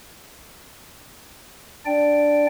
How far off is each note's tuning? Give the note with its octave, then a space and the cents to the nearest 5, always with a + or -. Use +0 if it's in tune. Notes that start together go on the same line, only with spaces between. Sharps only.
D4 +0 D5 +0 G5 +0